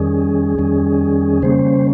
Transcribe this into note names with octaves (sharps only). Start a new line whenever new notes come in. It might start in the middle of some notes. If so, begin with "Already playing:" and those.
Already playing: F2 D#3 G3 C#4 G#4
F2 D#3 G3 C#4
C#3 G3 A#3 C#4 C5